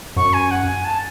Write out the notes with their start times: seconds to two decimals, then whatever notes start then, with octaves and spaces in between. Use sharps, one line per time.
0.16 F#2 C#6
0.33 G#5
0.51 F#5
0.68 G#5
0.85 A5